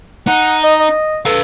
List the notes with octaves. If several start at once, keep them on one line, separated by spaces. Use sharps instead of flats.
D#4 F#5
D#5
D#5
A4 B4 F5